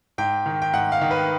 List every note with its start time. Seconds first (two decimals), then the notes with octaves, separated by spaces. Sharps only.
0.18 G#2 G5
0.46 D#3
0.62 G5
0.73 G#2 F#5
0.92 F5
1.01 D#3
1.11 B4